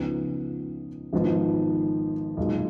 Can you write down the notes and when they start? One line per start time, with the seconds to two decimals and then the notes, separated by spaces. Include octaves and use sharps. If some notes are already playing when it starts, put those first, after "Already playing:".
Already playing: C#2 C#3 F3 B3 D#4
1.13 G#1 G#2 F3 B3
2.37 B1 A#2 G#3